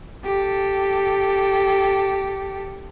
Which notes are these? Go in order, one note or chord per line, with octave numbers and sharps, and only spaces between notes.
G4 A4